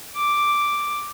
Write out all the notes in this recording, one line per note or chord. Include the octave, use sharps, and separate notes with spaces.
D6